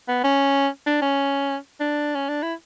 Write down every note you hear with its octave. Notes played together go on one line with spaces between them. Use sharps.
B3
C#4
D4
C#4
D4
C#4
D4
E4